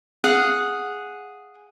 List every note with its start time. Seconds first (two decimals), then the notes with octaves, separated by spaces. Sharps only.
0.24 G#4 F5 F#5